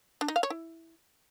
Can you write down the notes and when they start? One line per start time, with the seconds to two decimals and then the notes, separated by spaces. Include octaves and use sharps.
0.21 D4
0.28 D#4
0.36 F5
0.43 C#5
0.50 E4